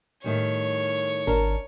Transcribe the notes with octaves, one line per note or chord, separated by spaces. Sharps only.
A2 D#3 G3 C#5
G#1 D4 A#4